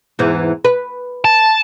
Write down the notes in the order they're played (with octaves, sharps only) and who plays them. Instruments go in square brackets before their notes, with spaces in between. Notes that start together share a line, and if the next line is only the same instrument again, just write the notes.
[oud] E2 G#2 E3
B4
[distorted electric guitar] A5